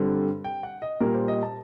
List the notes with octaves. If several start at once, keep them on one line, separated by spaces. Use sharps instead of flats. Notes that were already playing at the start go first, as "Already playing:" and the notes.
Already playing: G2 D3 G3 C4
G5
F#5
D#5
A#2 G3 A#3 A#4
C5
D#5
A5